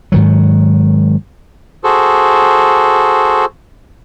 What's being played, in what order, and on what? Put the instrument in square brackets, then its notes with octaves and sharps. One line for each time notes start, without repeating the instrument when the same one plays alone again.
[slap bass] G#2 D#3 F#3
[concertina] F#4 G#4 A4 C5